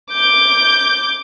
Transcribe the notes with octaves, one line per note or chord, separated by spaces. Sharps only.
D6 G6